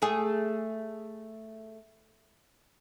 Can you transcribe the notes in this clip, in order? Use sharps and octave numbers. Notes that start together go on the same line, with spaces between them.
A3 G#4